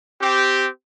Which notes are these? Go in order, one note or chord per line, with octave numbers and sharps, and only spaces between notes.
C4 G4